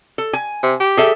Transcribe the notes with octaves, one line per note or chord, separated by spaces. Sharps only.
A4
G#5
C3
G4
G#4 A4 E5